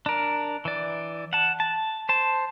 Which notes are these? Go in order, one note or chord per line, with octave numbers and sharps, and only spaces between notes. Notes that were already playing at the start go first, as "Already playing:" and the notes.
D4 A#4
E3 D5
F#5 A5
A5
C5 A5